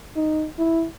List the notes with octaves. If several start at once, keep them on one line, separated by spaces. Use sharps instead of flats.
D#4
E4